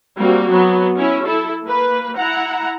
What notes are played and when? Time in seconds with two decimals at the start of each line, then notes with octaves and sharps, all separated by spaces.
0.18 G3 A#3 C4 F#4
0.52 F#3 B3
0.97 C#4 E4
1.26 E4 A4
1.64 A#3 B4
2.17 E4 F#5 A#5